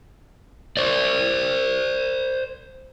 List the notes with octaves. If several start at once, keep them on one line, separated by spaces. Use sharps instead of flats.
C5 D5